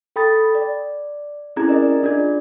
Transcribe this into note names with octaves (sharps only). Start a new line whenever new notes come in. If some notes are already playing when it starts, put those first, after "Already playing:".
A4 G5 B5 D#6 A6
D5
C4 C#4 E4 G#4 A#5 G#6
A#4 D5 D#5
D4 F4 G#4 D5 G#6